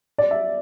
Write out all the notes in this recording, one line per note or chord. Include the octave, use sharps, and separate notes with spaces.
D5
E5